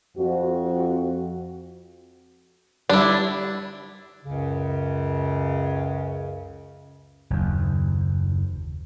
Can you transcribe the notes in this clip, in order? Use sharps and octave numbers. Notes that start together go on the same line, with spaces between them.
F2 C4 F#4
D3 G3 D4 E4
C#2 F#2 C#3
F#1 D#2